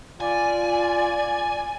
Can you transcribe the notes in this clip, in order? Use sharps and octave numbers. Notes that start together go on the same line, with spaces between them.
F4 D5 G#5